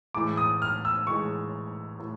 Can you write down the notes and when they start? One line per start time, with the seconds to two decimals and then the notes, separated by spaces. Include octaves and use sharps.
0.14 A2 E3 G#3 D6
0.37 D#6
0.62 F6
0.85 E6
1.07 A2 E3 G#3 C#6
2.00 A2